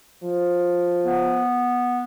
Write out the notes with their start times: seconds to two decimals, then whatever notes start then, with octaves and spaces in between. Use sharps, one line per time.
0.24 F3
1.04 B3